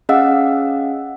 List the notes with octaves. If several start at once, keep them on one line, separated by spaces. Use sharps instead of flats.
C#4 G#4 D#5 F5 F#5 E6